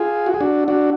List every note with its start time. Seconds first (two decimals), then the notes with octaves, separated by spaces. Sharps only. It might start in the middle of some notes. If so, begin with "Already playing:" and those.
Already playing: F4 G#4
0.26 F#4
0.34 G#4
0.41 D4 F#4
0.68 D4 F#4